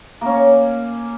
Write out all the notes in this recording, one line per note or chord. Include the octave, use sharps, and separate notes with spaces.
A#3 C#4